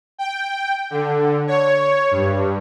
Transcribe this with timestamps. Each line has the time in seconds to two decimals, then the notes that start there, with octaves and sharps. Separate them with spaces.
0.18 G5
0.90 D3
1.47 C#5
2.11 G2